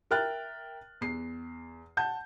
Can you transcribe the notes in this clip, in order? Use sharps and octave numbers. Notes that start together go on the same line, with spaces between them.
A#4 E5 G5 F6 F#6 A6
E2 C7
F#5 A5 G6